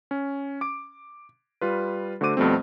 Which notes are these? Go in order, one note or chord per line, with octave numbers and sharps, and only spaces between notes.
C#4
D6 D7
G3 F4 B4
D3 A3 F#4 C5 D6 D#7
F2 B2 G3 A3 C4